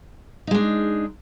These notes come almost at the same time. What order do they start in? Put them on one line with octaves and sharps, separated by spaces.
D#4 G#3 D4